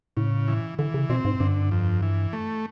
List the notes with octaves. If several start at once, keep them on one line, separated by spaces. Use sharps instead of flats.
A2 C#3
E3
D3 E3
C#3
B2 C4
G#2
G2 D3
F2
E3
A3